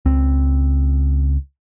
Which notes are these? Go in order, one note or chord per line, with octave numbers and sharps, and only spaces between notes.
C#2 C4